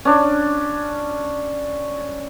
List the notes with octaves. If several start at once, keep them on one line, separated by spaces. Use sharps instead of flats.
C#4 D4